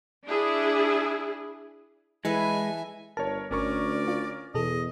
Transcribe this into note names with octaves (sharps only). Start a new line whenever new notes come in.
D4 E4 G#4
E3 G#3 A4 B4 E5 G#5
G1 A#4 C#5 A5
G1 D2 C#4 A#4 D5 C#6
F4
E2 B2 G#4 A4 D#5